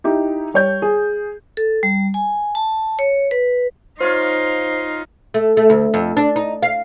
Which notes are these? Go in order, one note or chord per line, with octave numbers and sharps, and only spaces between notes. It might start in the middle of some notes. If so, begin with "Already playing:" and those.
D#4 E4 G4
G3 C#5 G6
G#4
A4
G3
G#5
A5
C#5
B4
D#4 F4 C5 C#5 F5 C6
A3
A3
D2
F2
D4
D#4
F5